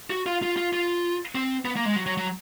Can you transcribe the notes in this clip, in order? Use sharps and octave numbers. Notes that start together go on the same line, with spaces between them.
F#4
F4
F4
F4
F4
C4
B3
A#3
G#3
F#3
F#3
F#3